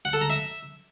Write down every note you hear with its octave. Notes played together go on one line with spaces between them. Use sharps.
F#5
A4
A#5
E5